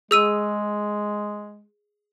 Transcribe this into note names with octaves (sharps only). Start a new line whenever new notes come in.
G#3 G#4 E6 D#7